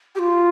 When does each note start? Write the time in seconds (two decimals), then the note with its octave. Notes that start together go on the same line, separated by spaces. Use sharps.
0.15 G4
0.18 F4